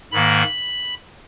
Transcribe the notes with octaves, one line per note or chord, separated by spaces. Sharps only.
G#2 D#3 A#3 B5